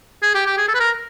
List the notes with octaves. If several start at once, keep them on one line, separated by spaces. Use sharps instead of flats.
G#4
G4
G4
G#4
A4
B4
A#4